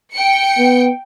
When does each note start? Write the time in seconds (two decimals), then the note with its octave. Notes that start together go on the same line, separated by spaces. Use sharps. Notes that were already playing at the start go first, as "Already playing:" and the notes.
0.13 G5 C#7
0.58 B3